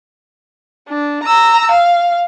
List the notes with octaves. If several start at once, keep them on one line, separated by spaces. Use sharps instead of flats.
D4
A#5 E6
F5